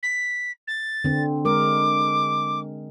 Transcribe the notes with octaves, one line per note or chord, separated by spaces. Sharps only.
B6
A6
D3 C4
G#3 A#4 D6